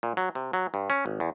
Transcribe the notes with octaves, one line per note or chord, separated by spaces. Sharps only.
A#2
F#3
C3
F#3
G2
C#4
G#1
E2